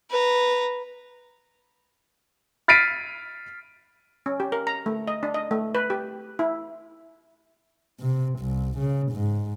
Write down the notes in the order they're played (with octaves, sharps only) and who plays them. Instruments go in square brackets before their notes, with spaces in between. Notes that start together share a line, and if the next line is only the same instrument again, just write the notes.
[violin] B4 A#5
[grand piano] F6 A6 B6 C7 D7 D#7
[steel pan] C#4
G4
A#4
A#5
A3
D#5
D4
D#5
A3
B4
G4
E4
[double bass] C3
C2
C#3
G#2